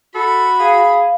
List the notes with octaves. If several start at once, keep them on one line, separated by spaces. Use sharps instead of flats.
F#4 A4 B5
G#4 F5